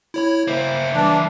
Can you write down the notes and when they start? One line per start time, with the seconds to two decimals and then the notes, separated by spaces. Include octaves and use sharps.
0.14 E4 C#5 B5
0.48 A#3 E4 C5
0.94 E3 G3 D4